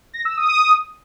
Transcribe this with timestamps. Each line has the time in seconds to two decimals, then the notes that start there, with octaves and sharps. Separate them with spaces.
0.14 A#6
0.25 E6
0.37 D#6